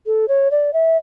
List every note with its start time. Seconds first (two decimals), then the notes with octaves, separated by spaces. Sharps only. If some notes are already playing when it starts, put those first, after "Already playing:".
0.06 A4
0.28 C#5
0.51 D5
0.73 E5